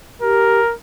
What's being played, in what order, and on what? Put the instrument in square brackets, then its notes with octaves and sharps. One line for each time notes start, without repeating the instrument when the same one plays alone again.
[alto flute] G4 [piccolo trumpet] A#4